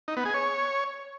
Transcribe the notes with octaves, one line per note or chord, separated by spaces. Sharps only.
D#4
B3
G#4
C#5